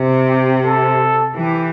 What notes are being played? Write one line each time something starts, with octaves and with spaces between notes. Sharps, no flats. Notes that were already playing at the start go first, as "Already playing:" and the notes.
Already playing: C3
G4
A4
E3 G4